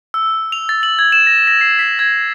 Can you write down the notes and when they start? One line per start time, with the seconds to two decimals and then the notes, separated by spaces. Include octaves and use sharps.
0.14 E6
0.52 F7
0.69 A6
0.83 F#7
0.99 G#6
1.12 E7
1.27 A#6
1.47 A#6
1.61 C7
1.79 B6
1.99 G#6